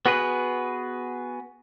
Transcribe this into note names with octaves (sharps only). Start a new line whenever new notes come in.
B3 F#4 G#4 B4